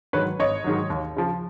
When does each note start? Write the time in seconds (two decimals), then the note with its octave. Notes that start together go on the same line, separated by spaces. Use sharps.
0.13 G#2 D#3 F#3 B4 C#5
0.39 G#1 C#5 D#5
0.64 G#2 D#3 F#3
0.90 D#2
1.16 C#3 F3